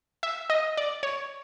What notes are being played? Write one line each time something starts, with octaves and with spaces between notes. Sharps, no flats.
E5
D#5
D5
C#5